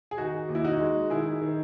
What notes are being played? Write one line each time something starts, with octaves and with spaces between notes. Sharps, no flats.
G#4
D#3 D#4 F#4
D#2
E4
D#4 F#4
G#3
D#3 E4 G#4
D#3